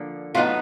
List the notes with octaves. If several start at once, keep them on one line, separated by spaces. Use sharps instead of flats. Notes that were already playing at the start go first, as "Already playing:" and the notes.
Already playing: D3 F3 A#3
A2 F#3 B3 D#4 F4